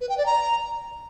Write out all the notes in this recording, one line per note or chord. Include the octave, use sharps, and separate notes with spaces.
B4
G5
D5
A#5